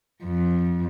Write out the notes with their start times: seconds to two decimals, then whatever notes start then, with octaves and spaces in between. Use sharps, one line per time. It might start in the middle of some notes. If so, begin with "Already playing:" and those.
0.24 F2